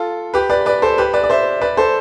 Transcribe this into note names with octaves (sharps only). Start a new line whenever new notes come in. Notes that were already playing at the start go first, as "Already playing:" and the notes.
Already playing: F4 A4
G4 B4
B4 D5
B4 D5
A4 C5
G4 B4
B4 D5
D5
C5 E5
B4 D5
A4 C5